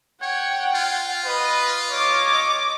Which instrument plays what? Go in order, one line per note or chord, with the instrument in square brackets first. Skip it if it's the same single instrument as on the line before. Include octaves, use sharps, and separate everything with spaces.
[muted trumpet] C#5 [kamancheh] F#5 G5
[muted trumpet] F4
[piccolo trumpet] B4 [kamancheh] D#5
[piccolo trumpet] C#5 [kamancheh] D#5 D6